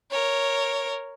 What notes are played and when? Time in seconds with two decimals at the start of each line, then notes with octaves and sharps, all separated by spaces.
0.11 A#4 C#5